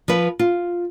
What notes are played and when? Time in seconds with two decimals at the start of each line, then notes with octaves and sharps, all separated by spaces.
0.08 F3 B4
0.39 F4